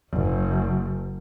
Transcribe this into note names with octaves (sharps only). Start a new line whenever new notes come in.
F#1